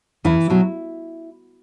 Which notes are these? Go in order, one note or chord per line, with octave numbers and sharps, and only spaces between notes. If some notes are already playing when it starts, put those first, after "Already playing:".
E2 E3 E4
B2 F#3